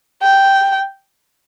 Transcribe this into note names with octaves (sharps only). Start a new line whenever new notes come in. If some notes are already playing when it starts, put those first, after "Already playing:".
G5